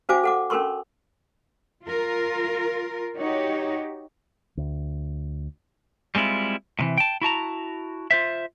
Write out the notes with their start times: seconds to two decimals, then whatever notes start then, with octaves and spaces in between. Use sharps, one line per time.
0.09 C#4 F#4 C5 F5 G#5 D6
0.24 A4 F#5 D6
0.50 C#4 D4 A4 A#4 C6 C#6
1.85 F4 A#4
3.17 D#4 F#4 G4 C#5
4.57 D2
6.15 G3 G#3 C4 E4 F4
6.79 A2 C3 E3
6.98 G5 A5
7.22 E4 F#4 A5 A#5
8.11 F4 C5 E5